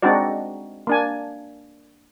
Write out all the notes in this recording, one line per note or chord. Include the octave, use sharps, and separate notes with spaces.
G#3 C4 D4 D#4 F#4 D5
A#3 D4 G#5